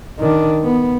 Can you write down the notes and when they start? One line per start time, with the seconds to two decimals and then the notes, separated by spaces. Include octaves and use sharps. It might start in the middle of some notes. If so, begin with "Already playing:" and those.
0.19 D#3 D4
0.64 B3